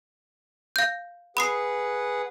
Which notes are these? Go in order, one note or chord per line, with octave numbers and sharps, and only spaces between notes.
F5 G6
G#4 B4 F#5 B5 D#6 C7